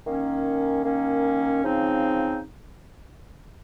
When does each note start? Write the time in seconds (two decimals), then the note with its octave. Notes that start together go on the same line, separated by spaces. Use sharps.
0.05 D#3 A#3 C#4
0.84 D#3 A#3 C#4
1.64 C#3 F3 C4 D#4